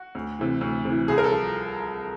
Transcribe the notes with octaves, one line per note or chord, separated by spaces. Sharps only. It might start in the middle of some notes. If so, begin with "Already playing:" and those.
Already playing: F#4
D2
C3 E3
D2
C3 E3
C2 G#4
A#4
A4
F3